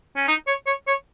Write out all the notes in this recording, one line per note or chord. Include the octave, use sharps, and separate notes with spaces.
C#4
D#4
C#5
C#5
C#5